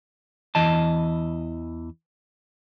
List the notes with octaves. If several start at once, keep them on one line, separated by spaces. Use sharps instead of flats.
E2 E3 D#5 A5